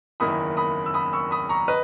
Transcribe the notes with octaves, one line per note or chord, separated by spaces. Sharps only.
F#1 E2 D#3 A#3 E4 B5 D#6
B5 D#6
E6
B5 D#6
C#6 E6
B5 D#6
A#5 C#6
B4 D#5